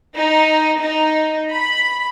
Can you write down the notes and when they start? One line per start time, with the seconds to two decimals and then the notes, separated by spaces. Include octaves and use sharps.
0.16 D#4
0.81 D#4
1.52 B5